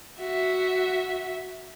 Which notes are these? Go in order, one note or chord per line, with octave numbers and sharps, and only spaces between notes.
F#4 E5